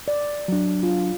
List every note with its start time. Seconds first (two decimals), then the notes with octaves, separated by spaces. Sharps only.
0.08 D5
0.48 F#3 D4
0.83 F4